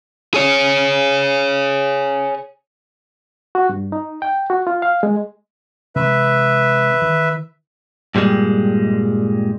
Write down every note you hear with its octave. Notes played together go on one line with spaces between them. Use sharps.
G#4 C#5
F#4
G2
D#4
G5
F#4
F4
F5
G#3
C3 E3 G#3 B4 E5
D#3 E3
G2 A#2 G3 G#3